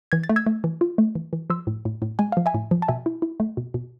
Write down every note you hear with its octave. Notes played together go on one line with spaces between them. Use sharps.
E3 G#6
A6
A3
E6 G#6
A3
E3
F4
A3
E3
E3
F3 C6 E6
A2
A2
A2
G#3 G#5
F3 F5
E5 G#5
A2
F3
A5
B2 E5 G#5
E4
E4
A3
B2
B2